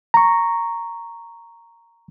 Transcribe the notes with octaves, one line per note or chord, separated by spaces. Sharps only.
A#5 C#6